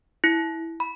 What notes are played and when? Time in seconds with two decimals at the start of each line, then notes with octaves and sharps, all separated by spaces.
0.24 E4
0.80 B5